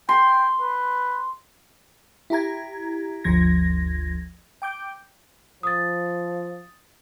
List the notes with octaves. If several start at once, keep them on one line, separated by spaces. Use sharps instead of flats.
G5 C6
B4
E4 G4 A#5 G#6
G1 D2 F3 G#6 A#6
G5 D6 G6
F3 D#6 A6